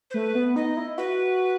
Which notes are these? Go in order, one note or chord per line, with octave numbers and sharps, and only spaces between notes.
C5
A3 B4
B3
D#4 D#5
E4
F#4 B4